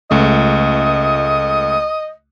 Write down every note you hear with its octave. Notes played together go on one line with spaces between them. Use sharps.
C#2 A3 D#5